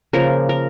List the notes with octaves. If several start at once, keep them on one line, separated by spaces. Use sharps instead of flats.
C#3 F3 A#3 A#4
A#4